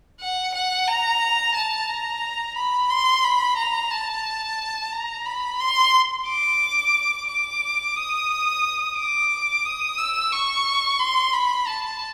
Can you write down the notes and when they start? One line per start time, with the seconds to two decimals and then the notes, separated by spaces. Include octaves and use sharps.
0.21 F#5
0.55 F#5
0.88 A#5
1.55 A5
1.89 A#5
2.57 B5
2.91 C6
3.24 B5
3.57 A#5
3.91 A5
4.92 A#5
5.26 B5
5.60 C6
6.27 D6
7.28 D6
7.96 D#6
8.97 D6
9.65 D#6
9.98 E6
10.32 C#6
10.99 C6
11.33 B5
11.67 A5